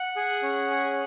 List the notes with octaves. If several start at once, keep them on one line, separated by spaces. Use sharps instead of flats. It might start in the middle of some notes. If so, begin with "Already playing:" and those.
Already playing: F#5
G#4
C#4
G#4